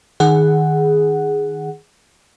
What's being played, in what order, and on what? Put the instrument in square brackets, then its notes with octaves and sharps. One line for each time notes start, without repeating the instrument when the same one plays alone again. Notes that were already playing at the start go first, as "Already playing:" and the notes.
[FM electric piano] D#3 G#4 F#5